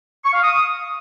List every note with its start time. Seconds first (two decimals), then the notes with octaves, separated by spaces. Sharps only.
0.25 C#6
0.34 F5
0.43 D#6